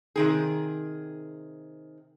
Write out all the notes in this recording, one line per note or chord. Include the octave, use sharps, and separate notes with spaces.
C3 D#3 G#4